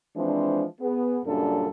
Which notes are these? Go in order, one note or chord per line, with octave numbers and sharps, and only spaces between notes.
E3 F3 G#3 C4 D4
B3 G#4
F#2 A#2 C#3 G3 D4 A4